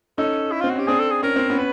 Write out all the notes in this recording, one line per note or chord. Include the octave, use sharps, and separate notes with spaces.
C#4 D#4 A4
E4
C4 F4
F#4
C#4 G4
C4 D4 G#4
A4
G#4
C#4 A#4
C4
B3 C#4
B4